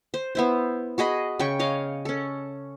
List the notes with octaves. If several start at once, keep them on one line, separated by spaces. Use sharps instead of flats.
C5
B3 E4 C5
F#4 G#4 D#5 B5
C#3 G5 C#6
C#5 D#5 F5
C#4 A4